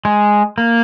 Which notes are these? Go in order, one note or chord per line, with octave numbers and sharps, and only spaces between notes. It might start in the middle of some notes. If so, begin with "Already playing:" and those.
G#3
A#3